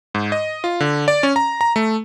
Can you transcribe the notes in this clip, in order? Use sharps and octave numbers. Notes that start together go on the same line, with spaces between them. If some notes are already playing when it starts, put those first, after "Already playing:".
G#2
D#5
F4
D3
D5
C#4
A#5
A#5
A3